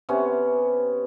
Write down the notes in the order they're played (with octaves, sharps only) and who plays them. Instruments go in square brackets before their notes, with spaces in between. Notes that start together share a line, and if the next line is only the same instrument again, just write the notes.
[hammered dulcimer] C3 B3 C#4